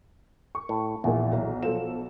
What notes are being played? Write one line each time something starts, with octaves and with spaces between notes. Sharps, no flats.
C#6
A2
A#1 E2 A#2
B1
B1 F3 A4 E7